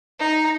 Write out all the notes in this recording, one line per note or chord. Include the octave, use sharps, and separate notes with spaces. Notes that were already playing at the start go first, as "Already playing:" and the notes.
D#4